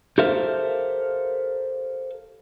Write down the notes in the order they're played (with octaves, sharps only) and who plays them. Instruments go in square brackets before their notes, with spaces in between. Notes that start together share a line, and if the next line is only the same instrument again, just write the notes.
[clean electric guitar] G4 A4 A#4 C5 E5 F5